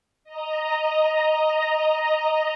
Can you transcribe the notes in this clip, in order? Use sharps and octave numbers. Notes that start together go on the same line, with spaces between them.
D#5 A#5